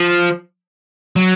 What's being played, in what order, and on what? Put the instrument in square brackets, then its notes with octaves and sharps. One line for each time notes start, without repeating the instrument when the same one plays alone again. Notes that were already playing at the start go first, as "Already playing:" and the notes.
Already playing: [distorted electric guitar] F3
F#3